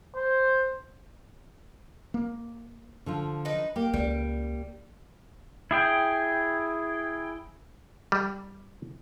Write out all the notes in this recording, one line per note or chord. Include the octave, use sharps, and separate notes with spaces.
C5
A#3
D3 F3 F4
D#4 B4
A#3 G4
C#2 G3
E4 G#4 G5
G3